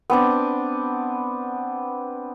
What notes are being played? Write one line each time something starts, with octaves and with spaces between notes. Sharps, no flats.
B3 C4 D4